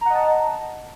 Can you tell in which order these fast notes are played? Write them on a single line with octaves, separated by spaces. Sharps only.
A#5 F#5 D#5 A5